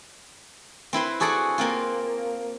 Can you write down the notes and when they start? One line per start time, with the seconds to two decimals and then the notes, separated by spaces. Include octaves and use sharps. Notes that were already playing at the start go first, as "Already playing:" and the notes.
0.93 C4 E4 B4 C6
1.20 F#4 G#4 A4 D5 F#5
1.58 A#3 C4 F4